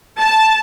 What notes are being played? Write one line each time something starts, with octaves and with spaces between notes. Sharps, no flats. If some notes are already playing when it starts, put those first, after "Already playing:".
A5